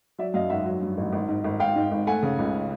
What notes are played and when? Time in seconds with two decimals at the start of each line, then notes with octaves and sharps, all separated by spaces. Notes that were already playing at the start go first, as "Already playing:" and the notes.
0.18 F#3 D5 E5
0.34 F#2 D#5 F5
0.50 G#1 E5 F#5
0.66 F#3
0.81 G2
0.97 A1
1.12 G#1
1.29 G#2
1.44 G#1
1.59 G#1 F5 G5
1.76 G#2
1.91 G#1
2.07 A3 F#5 G#5
2.23 C#3
2.39 C#2